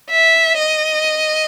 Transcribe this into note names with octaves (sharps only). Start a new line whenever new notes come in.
E5
D#5